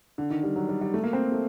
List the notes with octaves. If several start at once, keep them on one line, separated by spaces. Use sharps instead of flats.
D3
D#3
G3
F#3
G3
G3
A3
A#3
C4
A3